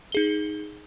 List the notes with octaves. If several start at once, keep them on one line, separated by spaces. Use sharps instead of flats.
D#4 G#4 G7